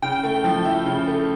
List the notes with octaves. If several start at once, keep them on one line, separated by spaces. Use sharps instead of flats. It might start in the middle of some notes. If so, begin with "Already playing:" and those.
C#3 G5
A3
F3
E4
C#3
A3